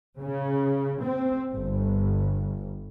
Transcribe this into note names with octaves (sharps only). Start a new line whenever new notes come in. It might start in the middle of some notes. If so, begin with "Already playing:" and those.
C#3
C4
G1